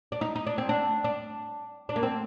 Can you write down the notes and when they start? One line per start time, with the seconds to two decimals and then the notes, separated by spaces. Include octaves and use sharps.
0.12 D4
0.21 D#4
0.36 D#4
0.47 D4
0.58 C4
0.69 D4
1.04 D4
1.89 D4
1.96 A#3
2.03 C4